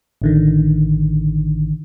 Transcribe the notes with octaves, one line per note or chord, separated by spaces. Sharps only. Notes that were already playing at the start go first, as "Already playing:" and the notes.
A1 D3 D#3